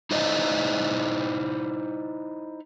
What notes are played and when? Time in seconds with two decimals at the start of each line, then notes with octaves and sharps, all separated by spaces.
0.11 D#4 E4 C5 D5 D#5